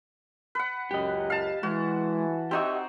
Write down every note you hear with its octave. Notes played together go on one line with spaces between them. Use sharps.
B4 F#5
C#2 F#2 G4 D#5
F5 A5
E3 G#3 F#4
C4 D#4 F#4 G4 D#5 E5